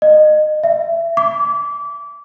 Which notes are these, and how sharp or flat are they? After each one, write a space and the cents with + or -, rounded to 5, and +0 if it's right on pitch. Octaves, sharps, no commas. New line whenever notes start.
D#5 -25
E5 +25
D6 -25